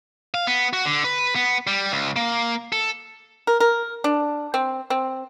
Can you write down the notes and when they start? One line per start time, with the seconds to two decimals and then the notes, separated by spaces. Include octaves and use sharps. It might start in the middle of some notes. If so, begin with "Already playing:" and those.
0.34 F5
0.47 B3
0.73 F#4
0.85 D3
1.04 B4
1.35 B3
1.67 G3
1.91 C#2
2.16 A#3
2.72 A4
3.47 A#4
3.60 A#4
4.04 D4
4.54 C4
4.90 C4